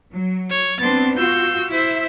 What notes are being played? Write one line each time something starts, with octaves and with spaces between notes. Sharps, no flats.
F#3
C#5
B3 C4 D4 C6 A6
F4 F#4 E6 G6
E4 C5 E5